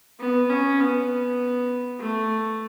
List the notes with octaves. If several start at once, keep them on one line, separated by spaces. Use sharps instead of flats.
B3
C#4
B3
A3